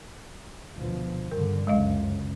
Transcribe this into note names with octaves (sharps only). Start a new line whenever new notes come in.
D2 B2 F3
G2 D3 A#4
C#2 F#2 G#3 D#5 F5